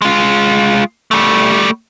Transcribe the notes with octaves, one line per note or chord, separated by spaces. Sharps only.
G#3 F4
G3 A3